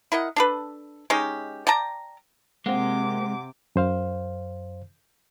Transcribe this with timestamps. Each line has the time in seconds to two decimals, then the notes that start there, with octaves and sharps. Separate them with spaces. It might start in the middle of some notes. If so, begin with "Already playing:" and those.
0.12 E4 A#4 D#5 F#5
0.36 D4 A4 B4
1.10 G#3 C#4 D#4 G4
1.67 D5 G5 A5 A#5
2.66 C3 G#3 A#3 C4 F#5 D6
3.76 F#2 C5 F5